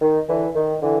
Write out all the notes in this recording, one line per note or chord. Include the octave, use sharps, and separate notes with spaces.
D#3
D3 E3
D#3
D3 E3